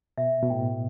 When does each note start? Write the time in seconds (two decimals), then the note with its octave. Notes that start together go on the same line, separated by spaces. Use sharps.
0.17 B2 E5
0.42 B2
0.50 A2 G5